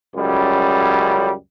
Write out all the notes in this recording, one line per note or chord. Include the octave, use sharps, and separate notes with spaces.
C#2 F#2 G3